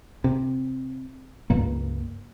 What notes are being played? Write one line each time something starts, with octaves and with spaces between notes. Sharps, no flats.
C3
C#2 G2 A#3